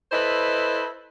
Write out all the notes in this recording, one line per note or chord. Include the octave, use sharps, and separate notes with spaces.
E4 A4 B4 C5 D#5